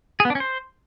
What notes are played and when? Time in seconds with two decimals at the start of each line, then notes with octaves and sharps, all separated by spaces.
0.20 G#4
0.25 B3
0.30 D4
0.35 C#4
0.40 C5